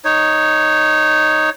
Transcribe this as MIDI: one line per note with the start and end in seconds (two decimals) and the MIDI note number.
0.05 1.50 63
0.05 1.50 73